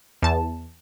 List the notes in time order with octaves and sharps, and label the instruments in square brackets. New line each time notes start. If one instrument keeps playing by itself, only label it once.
[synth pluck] E2 A5